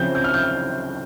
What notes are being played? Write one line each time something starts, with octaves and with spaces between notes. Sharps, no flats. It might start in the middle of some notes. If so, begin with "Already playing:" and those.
Already playing: C#3 F3 C4 G6
G6
F6
G6